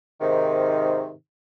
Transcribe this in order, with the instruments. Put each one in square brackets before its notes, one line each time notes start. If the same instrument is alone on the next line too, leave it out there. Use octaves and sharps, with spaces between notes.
[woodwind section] G#2 C3 D#3